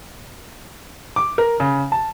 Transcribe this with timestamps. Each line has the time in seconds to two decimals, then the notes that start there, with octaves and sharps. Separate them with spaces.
1.16 D6
1.38 A#4
1.60 C#3
1.92 A5